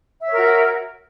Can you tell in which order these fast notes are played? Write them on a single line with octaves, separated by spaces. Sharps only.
E5 C#5 A#4 F#4